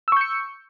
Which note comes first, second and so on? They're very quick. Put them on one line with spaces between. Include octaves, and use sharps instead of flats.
E6 C#6 G6 C#7